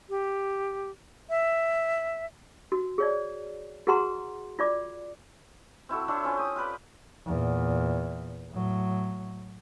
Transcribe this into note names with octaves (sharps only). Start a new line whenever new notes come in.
G4
E5
F#4
G#4 C#5 D5
F#4 G#4 B4 F#5 A#5 C6
F4 D5 D6
C4 E4 F#4 A4
C4 D4 E4 C#5
C4 C#4 F4
G4 D#6
F4 G4 B4 D5
E2 A#2
A2 F#3